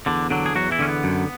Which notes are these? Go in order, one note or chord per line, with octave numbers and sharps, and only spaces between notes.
E2 D3 D4
D3 F#3 D4
G#4
E2 F#3 F#4
E3 E4
D3 C#4
B3
F#2